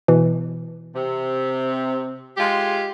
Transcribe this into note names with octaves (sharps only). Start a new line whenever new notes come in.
B2 E3
C3
G#3 F4 G4